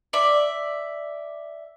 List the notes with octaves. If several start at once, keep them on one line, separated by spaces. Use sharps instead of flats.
D5 E5